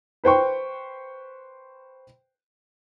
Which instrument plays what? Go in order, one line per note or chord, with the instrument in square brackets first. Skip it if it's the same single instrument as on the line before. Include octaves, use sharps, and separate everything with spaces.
[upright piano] B4 C5 G5 C#6